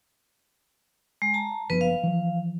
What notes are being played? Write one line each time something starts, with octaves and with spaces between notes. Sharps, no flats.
G#3
A5 A#5
F#1 F3 B3 B4
F5
E3 F3